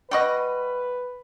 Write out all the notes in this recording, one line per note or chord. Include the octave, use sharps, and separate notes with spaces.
G3 F#4 B4 D#5